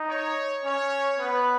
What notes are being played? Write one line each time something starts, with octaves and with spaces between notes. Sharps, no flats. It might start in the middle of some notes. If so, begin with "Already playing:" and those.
Already playing: D#4
C#5
C#4 C#5
B3 B4